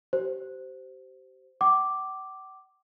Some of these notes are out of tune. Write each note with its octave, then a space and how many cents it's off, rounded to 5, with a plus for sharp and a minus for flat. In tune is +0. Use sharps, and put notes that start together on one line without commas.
G4 -35 C5 -10
F#5 +45 D6 +0